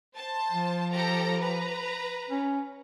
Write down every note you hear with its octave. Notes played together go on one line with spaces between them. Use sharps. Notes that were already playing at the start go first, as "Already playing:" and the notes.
C5 A5
F3
G4 A4 A#5
B4 A#5
C#4